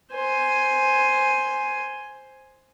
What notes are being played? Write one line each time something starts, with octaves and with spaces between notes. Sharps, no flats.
C5 G#5